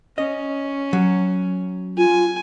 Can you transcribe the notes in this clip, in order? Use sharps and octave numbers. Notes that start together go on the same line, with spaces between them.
C#4 D#5
F#3
F4 G#5